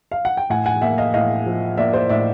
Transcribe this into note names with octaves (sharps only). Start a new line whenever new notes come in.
F5
F#5
G5
A2 F#5 G#5
F#5 G#5
A#3 E5 F#5
D#5 F5
A2 D#5 F5
F3
A#3 D5 E5
C5 D5
A2 D5 E5